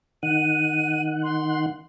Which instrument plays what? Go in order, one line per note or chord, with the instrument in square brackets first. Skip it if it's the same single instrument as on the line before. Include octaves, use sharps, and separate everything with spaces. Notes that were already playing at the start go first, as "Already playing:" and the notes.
[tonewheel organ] D#3 F#5 [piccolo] D#7
[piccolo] C6